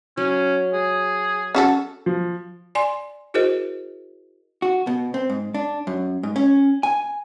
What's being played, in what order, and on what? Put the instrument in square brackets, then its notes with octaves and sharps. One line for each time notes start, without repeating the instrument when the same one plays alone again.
[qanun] F#3 [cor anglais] C#4
[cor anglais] G#4
[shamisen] C#4 F#4 A4
[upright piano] F3
[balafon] D5 G#5 C6
E4 F#4 G#4 A#4 C5 D#5
[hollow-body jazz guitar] F#4
B2
C4
G#2
D4
F#2
G#2
C#4
G#5